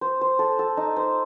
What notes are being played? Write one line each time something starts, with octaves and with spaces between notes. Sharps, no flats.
C5
C5
A4
A4
D#4
C5